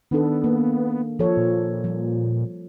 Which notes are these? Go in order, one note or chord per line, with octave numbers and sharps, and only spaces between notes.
D#3 B3 D4 A4
A#3
F3 A4 C#5
A#2
F3 G3